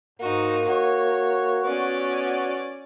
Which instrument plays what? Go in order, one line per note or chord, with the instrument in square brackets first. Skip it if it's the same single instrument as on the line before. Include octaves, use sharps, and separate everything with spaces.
[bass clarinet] G#2 [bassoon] A#3 [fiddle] D#4 F#4
[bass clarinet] F#4 [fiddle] C#5
[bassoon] B3 [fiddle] C#4 D5